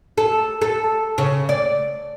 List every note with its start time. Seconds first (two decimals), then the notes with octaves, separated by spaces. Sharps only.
0.18 A4
0.61 A4
1.18 C#3
1.49 D5